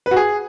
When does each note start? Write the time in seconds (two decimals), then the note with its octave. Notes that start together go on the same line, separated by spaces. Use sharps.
0.06 B4
0.11 F#4
0.16 G#4